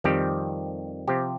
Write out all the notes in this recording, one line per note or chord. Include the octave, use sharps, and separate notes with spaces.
F2 D#3 G3 C4 G4
C3 F3 C4 G4